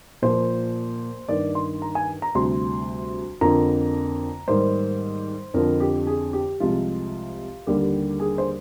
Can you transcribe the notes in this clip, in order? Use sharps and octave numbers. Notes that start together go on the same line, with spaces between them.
A#2 F3 A#3 C5
G2 D#3 A#3 D5
C6
A#5
G#5
A#5
D2 C3 G3 C6
F2 D3 F3 A#3 A#5
G#2 D#3 G3 A#3 C5
F2 D3 F3 A#4
G4
G#4
G4
C2 C3 F3 G#3 F4
D#2 D3 G3 A#3 G4
G#4
C5